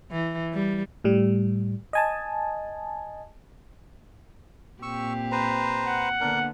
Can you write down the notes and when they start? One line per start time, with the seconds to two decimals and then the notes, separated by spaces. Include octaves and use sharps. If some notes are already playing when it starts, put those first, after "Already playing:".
0.12 E3
0.53 G3
1.04 A2 G3
1.93 D#5 G#5 A5
4.82 A#2 C4 G4 C#6 E6
5.32 B4 C5 A#5
5.86 F#5
6.20 D3 A#3 B3 D4 A#4